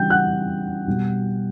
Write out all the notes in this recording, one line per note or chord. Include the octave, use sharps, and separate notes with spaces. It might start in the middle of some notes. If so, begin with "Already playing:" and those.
Already playing: C#3 E3 G3 G5 G6
F#5 F#6
B2 G3